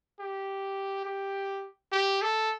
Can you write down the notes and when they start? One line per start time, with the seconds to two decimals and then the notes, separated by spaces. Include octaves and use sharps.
0.20 G4
1.05 G4
1.92 G4
2.22 A4